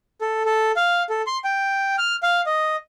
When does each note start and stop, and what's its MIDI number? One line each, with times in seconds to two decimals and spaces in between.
0.21 0.43 69
0.46 0.72 69
0.76 1.03 77
1.10 1.22 69
1.27 1.38 84
1.44 1.96 79
1.98 2.15 89
2.23 2.41 77
2.46 2.76 75